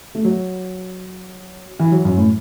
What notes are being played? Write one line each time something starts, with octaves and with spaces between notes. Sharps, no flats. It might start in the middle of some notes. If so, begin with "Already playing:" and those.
A3
F#3
E3
F#3
F#2
A2